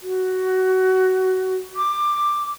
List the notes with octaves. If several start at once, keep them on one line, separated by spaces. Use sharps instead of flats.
F#4
D6